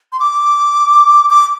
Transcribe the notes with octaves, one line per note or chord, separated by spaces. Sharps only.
C6
D6
D6